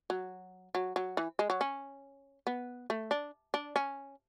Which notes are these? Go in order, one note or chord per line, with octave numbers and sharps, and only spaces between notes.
F#3
F#3
F#3
E3
G#3
F#3
C#4
B3
A3
D4
D4
C#4